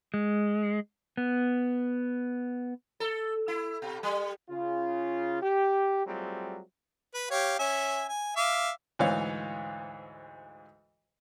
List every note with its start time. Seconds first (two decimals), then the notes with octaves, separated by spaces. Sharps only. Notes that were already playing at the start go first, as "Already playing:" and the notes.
0.14 G#3
1.17 B3
3.00 A4
3.48 E4
3.82 B2
4.03 G3
4.49 C#3 F4
5.42 G4
6.06 F#3 G3 A3 C4 F4 G#4
7.14 B4
7.31 G4 C#5 F5
7.59 C#4 E5 G#5
8.09 G#5
8.36 E5 F5 D6
8.99 D2 G#2 E3 C#5 F5